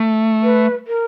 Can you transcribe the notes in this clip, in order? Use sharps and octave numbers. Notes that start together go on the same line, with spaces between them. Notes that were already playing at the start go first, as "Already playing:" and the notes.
Already playing: A3
B4
A#4